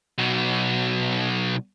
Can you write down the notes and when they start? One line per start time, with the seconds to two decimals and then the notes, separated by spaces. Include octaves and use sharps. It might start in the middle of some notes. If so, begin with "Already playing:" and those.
0.18 B1 B2